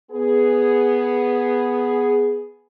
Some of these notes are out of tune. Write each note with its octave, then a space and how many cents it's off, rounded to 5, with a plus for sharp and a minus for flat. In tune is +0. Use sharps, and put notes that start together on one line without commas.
B3 +0 G#4 +0